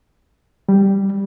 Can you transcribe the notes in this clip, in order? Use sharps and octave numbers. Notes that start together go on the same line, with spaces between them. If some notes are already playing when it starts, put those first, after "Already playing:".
G3